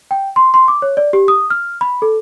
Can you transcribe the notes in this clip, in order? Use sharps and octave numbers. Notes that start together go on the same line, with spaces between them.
G5
C6
C6
D6
C#5
D5
G4
D#6
F6
B5
A4